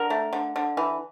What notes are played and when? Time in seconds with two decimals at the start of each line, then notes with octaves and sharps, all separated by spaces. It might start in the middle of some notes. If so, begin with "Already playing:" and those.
Already playing: D3 A#4
0.10 A3
0.33 D3
0.56 D3
0.77 E3